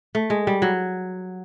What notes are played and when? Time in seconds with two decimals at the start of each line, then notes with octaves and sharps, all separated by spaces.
0.15 A3
0.30 G#3
0.47 G3
0.62 F#3